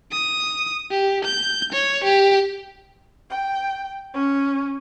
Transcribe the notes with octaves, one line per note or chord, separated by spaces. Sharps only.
D#6
G4
G6
C#5
G4
G5
C#4